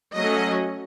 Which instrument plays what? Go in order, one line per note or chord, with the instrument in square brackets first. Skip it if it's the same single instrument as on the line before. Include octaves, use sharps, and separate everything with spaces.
[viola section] F#3 A3 C#4 D#5